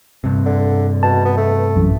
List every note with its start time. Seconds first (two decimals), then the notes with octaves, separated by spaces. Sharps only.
0.24 G2 C3
0.46 D3
1.03 B2 A5
1.25 B3
1.37 A3
1.76 A#1 F#2 E3